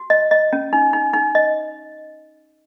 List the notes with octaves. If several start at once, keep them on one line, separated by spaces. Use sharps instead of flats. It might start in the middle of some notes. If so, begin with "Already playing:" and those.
Already playing: F#4
D#5
D#5
C#4
D#4
D#4
D#4
D#5